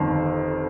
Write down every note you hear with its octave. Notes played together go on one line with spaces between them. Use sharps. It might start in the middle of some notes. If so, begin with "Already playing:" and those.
Already playing: G1 F2 D#3